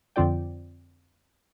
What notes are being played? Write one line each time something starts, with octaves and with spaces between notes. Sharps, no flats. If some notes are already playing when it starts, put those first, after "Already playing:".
F2 D3 C4 F4 D5 G5